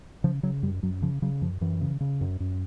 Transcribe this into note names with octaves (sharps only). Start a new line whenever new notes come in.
C#3 F3
C#3 F#3
F#2 G3
F#2 F#3
C#3 F3
C#3 F#3
F#2 F3
F#2 E3
C#3
C#3
F#2
F#2